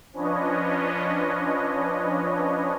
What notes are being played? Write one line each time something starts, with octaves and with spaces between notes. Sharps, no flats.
F3 C#4 D4 B4 C#5 D#5